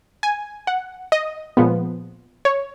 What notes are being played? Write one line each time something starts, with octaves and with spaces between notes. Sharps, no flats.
G#5
F#5
D#5
A#2 F3 G#3 B3
C#5